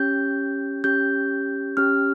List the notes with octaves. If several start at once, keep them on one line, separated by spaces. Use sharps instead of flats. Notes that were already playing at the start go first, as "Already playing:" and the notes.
Already playing: C#4 G4 G6
C#4 G4 G6
C#4 G4 F6